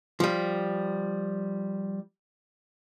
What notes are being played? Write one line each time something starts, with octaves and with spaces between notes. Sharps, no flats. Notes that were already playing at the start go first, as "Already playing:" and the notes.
F3 G3